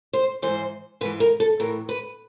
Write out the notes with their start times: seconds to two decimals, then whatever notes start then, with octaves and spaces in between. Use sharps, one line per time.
0.13 C5
0.42 G#2 E3 C5
1.01 G#2 B4
1.05 E3
1.20 A#4
1.40 A4
1.60 A2 E3 A#4
1.89 B4